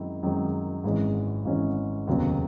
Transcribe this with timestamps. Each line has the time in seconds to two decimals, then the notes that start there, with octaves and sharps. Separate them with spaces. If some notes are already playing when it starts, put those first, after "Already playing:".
Already playing: F#2 D#3 G#3 C4 E4
0.23 F#2 D#3 G#3 C4 E4
0.84 G#1 G#2 E3 G#3 C#4
1.45 G#1 G#2 E3 G#3 C#4
2.07 F1 D#2 C#3 F#3 B3